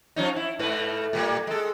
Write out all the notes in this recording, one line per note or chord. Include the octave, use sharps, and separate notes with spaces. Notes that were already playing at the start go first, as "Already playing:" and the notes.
F3 C#4 D#4
E4
G#2 A3 B4
A2 G3 A#3
G#3 A4